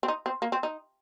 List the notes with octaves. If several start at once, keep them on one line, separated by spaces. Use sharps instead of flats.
C4
D#4
C4
A#3
C4
D#4